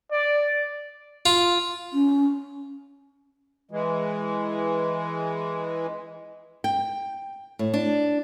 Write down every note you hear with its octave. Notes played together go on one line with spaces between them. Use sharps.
D5
F4
C#4
E3 G#3
G5
A2
D4